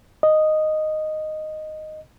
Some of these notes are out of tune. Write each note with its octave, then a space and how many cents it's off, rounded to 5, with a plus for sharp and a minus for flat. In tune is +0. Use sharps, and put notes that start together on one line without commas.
D#5 -5